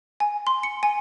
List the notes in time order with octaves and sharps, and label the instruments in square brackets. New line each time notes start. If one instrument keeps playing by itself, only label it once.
[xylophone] G#5
C6
C#7
G#5